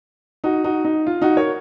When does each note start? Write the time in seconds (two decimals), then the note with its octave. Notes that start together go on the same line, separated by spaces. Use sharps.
0.44 D#4 F#4
0.64 D#4 F#4
0.84 D#4
1.07 F4
1.21 D#4 F#4
1.37 A#4 C#5